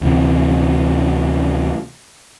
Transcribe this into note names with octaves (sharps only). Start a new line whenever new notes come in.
D2 C3 E3